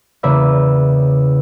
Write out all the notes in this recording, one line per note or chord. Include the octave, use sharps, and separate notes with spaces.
E2 C#3 A#3 B4 D5 E5